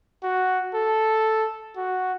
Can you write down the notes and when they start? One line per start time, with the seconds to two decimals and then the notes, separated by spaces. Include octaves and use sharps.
0.23 F#4
0.74 A4
1.77 F#4